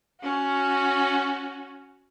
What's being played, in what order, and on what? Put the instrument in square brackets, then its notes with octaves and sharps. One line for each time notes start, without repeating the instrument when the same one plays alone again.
[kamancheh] C#4 F#4